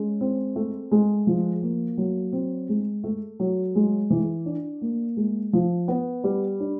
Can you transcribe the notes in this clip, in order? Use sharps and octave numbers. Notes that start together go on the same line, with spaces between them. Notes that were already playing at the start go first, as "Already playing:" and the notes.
Already playing: G#3 C#4
C4
A3
G#3
F3
A#3
F#3
C4
G#3
A3
F#3
G#3
E3
D4
A#3
G#3
F3
B3
G3
D4